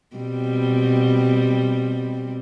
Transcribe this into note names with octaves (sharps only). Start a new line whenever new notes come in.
B2 G3 C4